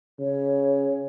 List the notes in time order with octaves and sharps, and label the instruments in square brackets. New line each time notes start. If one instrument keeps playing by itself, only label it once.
[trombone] C#3 [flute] C#5